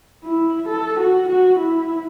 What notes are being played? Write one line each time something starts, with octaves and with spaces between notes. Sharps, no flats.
E4
A4
F#4
F#4
E4